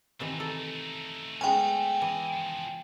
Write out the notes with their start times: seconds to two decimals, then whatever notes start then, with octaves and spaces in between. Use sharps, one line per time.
0.20 C3 D#3 E3 A3 D#4
0.40 A4
1.41 G#3 B3 C#4 G5 G#5
2.02 E3 E4 D#5
2.33 D#3 F3